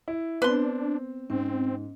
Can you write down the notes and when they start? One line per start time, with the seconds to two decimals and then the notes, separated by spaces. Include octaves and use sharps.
0.08 E4
0.42 B3 C4 D4 B4 C6
1.30 G#2 C4 C#4